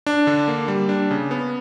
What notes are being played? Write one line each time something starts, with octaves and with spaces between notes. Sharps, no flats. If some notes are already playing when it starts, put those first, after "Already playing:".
D4
D3
A#3
G3
D4
C#3
B3